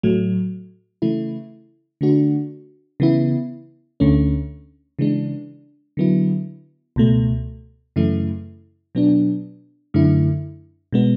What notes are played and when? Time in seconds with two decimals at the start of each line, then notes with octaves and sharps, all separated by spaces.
0.03 A2 F#3 A3
1.02 C#3 E3 A3 E4
2.01 D3 A3 D4 F#4
3.00 C#3 E3 B3 E4
4.00 D2 D3 A3 C#4
4.99 C#3 E3 G#3 D4
5.97 D3 F#3 B3 E4
6.96 C#2 B2 A3
7.96 F#2 C#3 E3 A3 E4
8.95 B2 F#3 B3 D4
9.94 F#2 D3 A3 E4
10.93 B2 G#3 B3